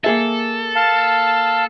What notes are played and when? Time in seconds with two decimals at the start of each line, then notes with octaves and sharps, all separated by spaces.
0.04 A#3 G#4 A4 E5
0.76 F5 A5